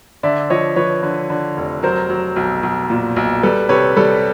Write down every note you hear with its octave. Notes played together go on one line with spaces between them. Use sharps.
D3 D5 E5
F3 C#5 D#5
F3 B4 C#5
D3
D3
F1
F#3 A#4 C5
F#3
B1
B1
A#2
B1
G3 A4 B4
C3 B4 C#5
G3 A4 B4